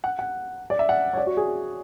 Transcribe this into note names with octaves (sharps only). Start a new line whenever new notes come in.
F#5
F#5
D5
E5
F#5
C#5
D5
F#4
G#4